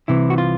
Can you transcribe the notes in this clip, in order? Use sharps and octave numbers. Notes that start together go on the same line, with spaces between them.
C2 C3 E3 E4
F#4
F4